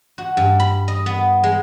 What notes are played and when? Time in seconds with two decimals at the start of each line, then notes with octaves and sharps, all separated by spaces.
0.18 F#4
0.37 G2
0.60 B5
0.88 D#5
1.06 B3
1.44 G#3